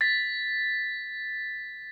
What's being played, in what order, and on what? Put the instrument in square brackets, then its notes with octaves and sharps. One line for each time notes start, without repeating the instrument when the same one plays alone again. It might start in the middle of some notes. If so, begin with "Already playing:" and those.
[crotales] A6 B6